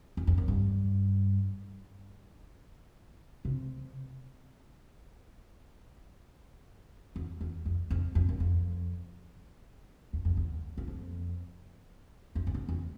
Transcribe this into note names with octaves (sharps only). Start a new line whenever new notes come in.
E2
F2
F#2
G2
C3
E2
E2
F2
F2
F2
F#2
F2
E2
F2
E2
E2
F2
F2
F2
E2
E2